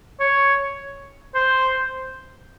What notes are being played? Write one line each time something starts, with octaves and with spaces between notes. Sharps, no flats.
C#5
C5